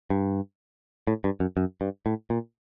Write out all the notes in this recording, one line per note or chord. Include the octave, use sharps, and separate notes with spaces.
G2
A2
G2
F#2
F#2
G2
A2
A#2